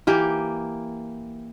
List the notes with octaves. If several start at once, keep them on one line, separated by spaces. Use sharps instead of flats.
E3 A#3 G4